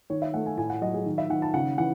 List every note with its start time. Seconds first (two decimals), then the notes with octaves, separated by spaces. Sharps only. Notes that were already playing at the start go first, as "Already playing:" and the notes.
0.10 D#3 C#5
0.22 E5
0.34 A3 F#5
0.46 G#5
0.58 A2 G#5
0.70 F#5
0.81 F#3 D#5
0.94 G#4
1.06 D#3
1.18 E5
1.30 D#3 F#5
1.42 A5
1.54 C#3 F#5
1.78 E3 F#5